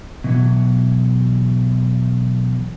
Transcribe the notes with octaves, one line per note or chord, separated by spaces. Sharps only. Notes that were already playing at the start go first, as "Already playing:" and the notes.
B2 E3 F#3